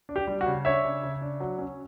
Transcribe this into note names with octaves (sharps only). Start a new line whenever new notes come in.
D4
G4
G3
F#4
C#3
D4 C#5 E5
C#3
C#3
D4
F#3
C#4